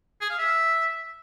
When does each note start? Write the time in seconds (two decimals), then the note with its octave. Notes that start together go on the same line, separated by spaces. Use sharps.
0.21 G#4
0.30 F5
0.39 E5